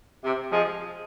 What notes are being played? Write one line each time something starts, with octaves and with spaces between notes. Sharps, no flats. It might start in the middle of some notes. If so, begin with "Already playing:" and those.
C3
F3 G#3